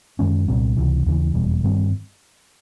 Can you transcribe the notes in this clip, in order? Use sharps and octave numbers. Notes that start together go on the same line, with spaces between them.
F#2 D#3 G#3 C#4
C2 A#2 G3 C4
C#2 C3 E3
D#2 C#3 E3
F1 E2 B2 G3
G2 D#3 G3 C4